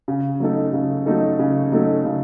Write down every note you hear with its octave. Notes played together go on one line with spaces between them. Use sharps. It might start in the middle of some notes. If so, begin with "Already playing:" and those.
C#3
F#3 A3 D#4 A4
C#3
F#3 A3 D#4 A4
C#3
F#3 A3 D#4 A4
C#3